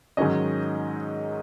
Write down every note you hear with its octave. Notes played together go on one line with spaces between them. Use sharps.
G#2 D#3 F#3 C#4 D#5